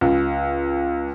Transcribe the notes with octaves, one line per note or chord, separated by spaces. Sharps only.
C#2